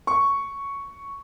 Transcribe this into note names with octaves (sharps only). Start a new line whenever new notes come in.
C#6